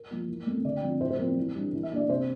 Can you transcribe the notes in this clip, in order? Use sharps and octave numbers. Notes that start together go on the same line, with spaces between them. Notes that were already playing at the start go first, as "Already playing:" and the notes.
Already playing: A#4
F3 A#3
E3
A3 C4
D3 D5
G5
F3 C4
A2 C5
C5
F3 C4 A#4
E3
G3 D4
E3
E5
A#3 D4 D5
C3 C5